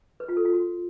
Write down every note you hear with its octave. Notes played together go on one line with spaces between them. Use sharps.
B4
F4
A4
F4
F#4